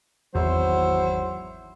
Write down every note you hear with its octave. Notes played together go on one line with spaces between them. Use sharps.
G#1 E2 F#3 E4 C5